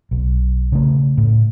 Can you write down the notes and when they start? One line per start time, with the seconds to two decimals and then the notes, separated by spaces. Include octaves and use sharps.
0.11 B1
0.72 C#3 A3
1.18 A2